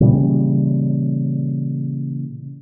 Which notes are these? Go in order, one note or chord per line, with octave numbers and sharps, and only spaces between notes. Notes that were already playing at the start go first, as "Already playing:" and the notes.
A#2 C#3 E3 G3